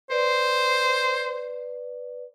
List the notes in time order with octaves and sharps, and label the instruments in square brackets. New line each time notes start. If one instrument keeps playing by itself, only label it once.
[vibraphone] B4 D5 [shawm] C5